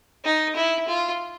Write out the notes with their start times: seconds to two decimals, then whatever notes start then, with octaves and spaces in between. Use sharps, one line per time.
0.25 D#4
0.55 E4
0.88 F4